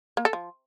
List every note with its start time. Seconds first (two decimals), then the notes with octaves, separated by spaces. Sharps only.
0.17 A#3
0.25 A4
0.33 F3